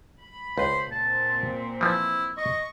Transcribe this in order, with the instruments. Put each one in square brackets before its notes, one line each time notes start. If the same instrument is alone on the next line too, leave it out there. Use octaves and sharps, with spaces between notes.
[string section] B5
[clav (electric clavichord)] C#2 B4 [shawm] C5
[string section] A#2 C4 [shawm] A5
[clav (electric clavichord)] E3 F3 [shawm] E4
[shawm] D#5 [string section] C#6